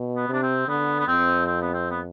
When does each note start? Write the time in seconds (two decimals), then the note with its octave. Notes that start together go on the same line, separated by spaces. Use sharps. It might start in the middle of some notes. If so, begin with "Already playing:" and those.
Already playing: B2
0.16 B3
0.29 C3 D4
0.43 C4
0.68 D3 B3
0.99 B3
1.08 F2 C4
1.46 C4
1.61 B3
1.73 C4
1.91 B3